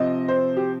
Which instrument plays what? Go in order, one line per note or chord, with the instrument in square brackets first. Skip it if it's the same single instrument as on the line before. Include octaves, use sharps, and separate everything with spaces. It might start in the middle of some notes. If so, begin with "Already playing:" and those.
Already playing: [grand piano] C3 F3 C4 [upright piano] D#5
[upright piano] C5
G4